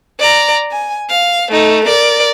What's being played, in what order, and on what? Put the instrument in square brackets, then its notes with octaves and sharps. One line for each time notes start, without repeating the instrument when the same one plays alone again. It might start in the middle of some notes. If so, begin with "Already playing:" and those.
[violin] D5 A#5
G#5
F5
A3 D#4
A#4 D5